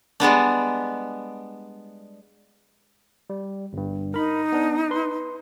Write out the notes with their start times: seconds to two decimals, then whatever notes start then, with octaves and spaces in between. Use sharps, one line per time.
0.20 G3 G#3 B3 D4
3.30 G3
3.73 G1 G2
4.14 D#4 A#4 B5
4.52 B3 D4
4.91 B4 C6